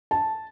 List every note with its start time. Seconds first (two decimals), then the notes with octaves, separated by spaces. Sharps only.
0.11 A5